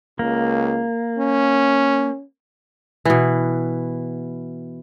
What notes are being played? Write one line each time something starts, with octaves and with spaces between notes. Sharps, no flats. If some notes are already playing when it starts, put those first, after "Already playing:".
C#2 A#3
C#4
B2 E3